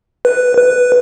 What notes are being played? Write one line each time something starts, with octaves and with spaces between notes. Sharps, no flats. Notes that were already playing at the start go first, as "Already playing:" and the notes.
B4
B4